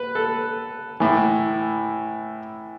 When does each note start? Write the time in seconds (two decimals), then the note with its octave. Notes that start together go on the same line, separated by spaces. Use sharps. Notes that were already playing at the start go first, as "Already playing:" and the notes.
Already playing: B4
0.15 A4
1.00 A2 E3